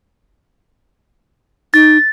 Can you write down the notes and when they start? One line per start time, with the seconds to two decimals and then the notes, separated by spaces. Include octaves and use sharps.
1.74 D#4 A6